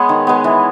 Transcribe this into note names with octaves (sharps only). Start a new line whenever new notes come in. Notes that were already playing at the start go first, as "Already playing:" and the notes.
Already playing: G#3 B3 C#5
D#3
G#3 B3
E3